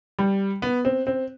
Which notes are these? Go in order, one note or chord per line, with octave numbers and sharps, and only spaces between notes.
G3
B3
C4
C4